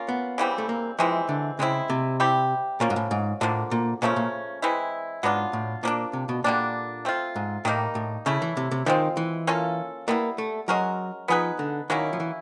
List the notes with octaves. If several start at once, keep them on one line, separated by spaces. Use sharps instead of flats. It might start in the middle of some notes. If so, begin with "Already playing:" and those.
Already playing: A#3 C#4 F4
B3
C#3 E3 G3 C4
A3
A#3
C3 E3 F3 G#3 C4
D3
C#3 G#3 C4 E4
C3
G3 C4 E4 G4
A#2 F3 A#3 C#4
G#2
A2
G#2
A2 D3 F3 A#3
A#2
A#2 C#3 F3 A3 C#4
A#2
E3 G#3 C4 E4
G#2 F#3 B3 D4 F4
A2
A#2 F3 A#3 D4
C3
B2
A#2 D3 G3 A#3 D4
A3 C4 F4
G#2
A2 D#3 G3 A#3 D#4
A2
C#3 A3 C#4 E4
E3
C3
C3
D#3 F3 G#3 C4
E3
A#3 C#4 F4 A4
G3 A#3 B3 E4
A3
F#3 G#3 C#4 F#4 A#4
F3 B3 D#4 G#4 B4
D3
D#3 F#3 A#3 C#4 E4
F3
E3